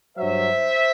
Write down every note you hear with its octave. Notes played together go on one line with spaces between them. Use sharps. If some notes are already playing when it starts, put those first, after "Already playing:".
G2 F#3 C5 E5